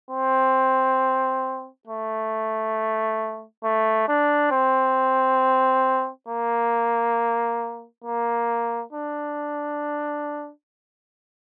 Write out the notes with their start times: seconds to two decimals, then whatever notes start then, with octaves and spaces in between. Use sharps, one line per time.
0.11 C4
1.87 A3
3.64 A3
4.08 D4
4.51 C4
6.28 A#3
8.04 A#3
8.93 D4